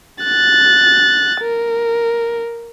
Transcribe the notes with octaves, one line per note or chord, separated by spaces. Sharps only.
F#6 A6
A#4